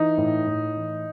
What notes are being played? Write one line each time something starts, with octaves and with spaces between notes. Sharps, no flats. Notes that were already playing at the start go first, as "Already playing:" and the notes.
Already playing: E3 D#4
A2
A2
E3